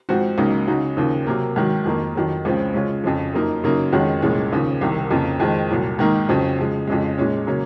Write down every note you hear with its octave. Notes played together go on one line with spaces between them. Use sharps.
G#2 F3 C4 F#4
C#2 C#3 F#3 A#3 D#4
C#3 G#3 D#4 F#4
D#2 C#3 F3
C3 F#3 A#3
G#2 D#3 F#3
F2 D#3 A#3
F2 D#3 F#3
C#2 C#3 F3 C4
C#3 G#3 C#4 F4
F2 C#3 F3
F#2 F3 A#3 D#4
F#2 C#3 F#3 A#3 D#4
F2 D#3 G#3 C#4 F#4
C2 A#2 F3 G#3 C#4
D#2 C#3 F3
C2 C3 D#3
F2 C#3 F3 A#3
F2 D#3 G#3 C4
C2 A#2 F#3
G#2 D#3 A#3 D#4
F2 C#3 F#3 C4
C#3 F3 G#3
F2 C#3 G#3
A#2 G#3 C#4
C#3 F#3 A#3 C#4